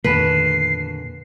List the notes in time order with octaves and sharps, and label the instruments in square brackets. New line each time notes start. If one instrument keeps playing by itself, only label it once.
[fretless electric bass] F2 D#3 A3 [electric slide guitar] A#2 D3 A5 [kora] B4 [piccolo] C7